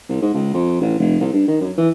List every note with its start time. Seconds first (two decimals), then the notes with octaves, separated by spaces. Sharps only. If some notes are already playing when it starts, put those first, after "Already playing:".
0.09 C2
0.22 G#2
0.34 C#2
0.54 F2
0.81 A1
1.00 F1
1.21 C2
1.33 G2
1.48 D#3
1.61 F#2
1.78 E3